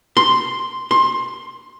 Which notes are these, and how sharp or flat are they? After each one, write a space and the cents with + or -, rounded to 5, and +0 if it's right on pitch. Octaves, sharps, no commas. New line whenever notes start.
C6 -5
C6 +20